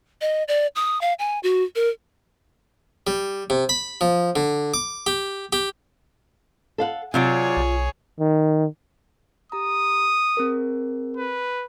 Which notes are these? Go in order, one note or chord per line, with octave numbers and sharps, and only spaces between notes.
D#5
D5
D#6
F5
G#5
F#4
A#4
G3
C3
B5
F3
D3
D6
G4
G4
A4 F5 F#5
C3 F#3 F4 G#4 C#5 D5
B1
D#3
G4 A#5 D#6
C4 G#4 A#4
B4